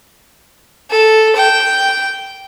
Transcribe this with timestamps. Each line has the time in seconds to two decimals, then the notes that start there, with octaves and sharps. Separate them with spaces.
0.90 A4
1.36 G5